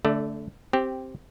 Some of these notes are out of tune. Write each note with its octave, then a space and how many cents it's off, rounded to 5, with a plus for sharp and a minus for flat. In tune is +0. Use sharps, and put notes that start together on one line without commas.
D3 -25 A3 +0 D5 +20
C4 +0 G4 -5